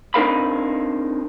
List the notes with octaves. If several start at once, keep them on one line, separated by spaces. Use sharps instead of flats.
C4 D4 D#4 A#4 F5 B5